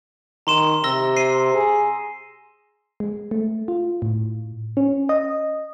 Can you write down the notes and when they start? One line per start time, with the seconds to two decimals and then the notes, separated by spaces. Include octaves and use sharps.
0.47 D#3 A#5 C6 E7
0.84 C3 E6 A#6 G7
1.17 C7 D#7
1.54 G#4
3.00 G#3
3.31 A3
3.68 F4
4.02 A2
4.77 C#4
5.09 D#5